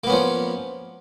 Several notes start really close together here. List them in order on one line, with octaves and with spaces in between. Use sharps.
A#3 B3 C#4 F3